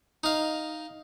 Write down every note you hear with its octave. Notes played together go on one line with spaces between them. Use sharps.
D#4 F5